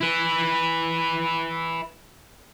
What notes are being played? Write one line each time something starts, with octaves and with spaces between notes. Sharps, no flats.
E4 B4